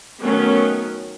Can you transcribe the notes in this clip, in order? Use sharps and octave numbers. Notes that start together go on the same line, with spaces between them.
D#3 F#3 A3 B3 C#4